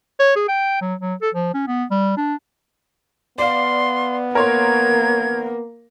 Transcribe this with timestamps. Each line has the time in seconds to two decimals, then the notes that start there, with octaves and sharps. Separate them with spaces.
0.19 C#5
0.36 G#4
0.48 G5
0.81 F#3
1.01 F#3
1.22 A4
1.34 F3
1.54 C#4
1.67 B3
1.91 G3
2.17 D4
3.38 B3 D5 F5 C6
4.35 A#3 A#4 C#5 C6 G#6